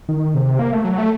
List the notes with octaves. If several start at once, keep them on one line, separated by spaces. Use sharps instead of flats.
D#3
C3
A#3
A3
F#3
A3